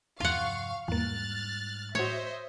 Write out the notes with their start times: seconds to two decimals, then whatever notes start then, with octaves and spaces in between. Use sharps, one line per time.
0.20 E2 G2 C3 F3 F4 F5 F#5 C#6
0.88 E2 G#2 G3 G#3 A#3 F6 F#6 A6
1.95 A2 F#4 C5 C#5 D#5 E5